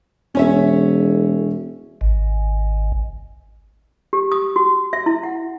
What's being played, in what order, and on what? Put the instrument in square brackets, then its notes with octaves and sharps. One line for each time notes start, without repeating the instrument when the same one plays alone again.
[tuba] E1 [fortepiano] C#4 C#5 E5
[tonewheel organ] G#1
[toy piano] G4
D#6
F#4
E5
E4
F#5